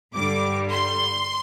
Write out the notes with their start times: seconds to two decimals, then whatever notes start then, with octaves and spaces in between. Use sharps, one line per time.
0.14 G2 D3 G3 D6
0.71 C6